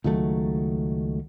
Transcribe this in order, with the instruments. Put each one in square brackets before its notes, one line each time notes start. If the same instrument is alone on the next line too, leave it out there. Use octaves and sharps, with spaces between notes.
[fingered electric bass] C#2 D#3 F#3 A3